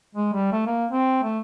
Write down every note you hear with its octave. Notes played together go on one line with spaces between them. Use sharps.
G#3
G3
A3
A#3
C4
A3